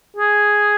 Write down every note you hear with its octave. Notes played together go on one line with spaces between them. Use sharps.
G#4